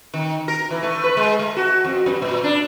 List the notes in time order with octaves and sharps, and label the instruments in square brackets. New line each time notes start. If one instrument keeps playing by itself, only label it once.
[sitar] D#3
A#4
E3
A3
B4
G#3
A3
F#4
F2
F#2
A#2
D4